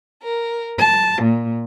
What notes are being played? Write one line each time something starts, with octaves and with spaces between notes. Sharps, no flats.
A#4
A5
A#2